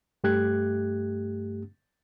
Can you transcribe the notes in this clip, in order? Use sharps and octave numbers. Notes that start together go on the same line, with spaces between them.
G2 A3 G4 F#6 G#6